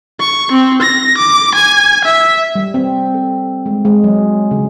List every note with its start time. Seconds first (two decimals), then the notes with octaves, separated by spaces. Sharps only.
0.20 C#6
0.52 C4
0.82 A#6
1.18 D6
1.54 G#5
2.05 E5
2.55 G3
2.74 C4
3.14 A4
3.66 G#3
3.85 G#3
4.04 F#3
4.51 C#3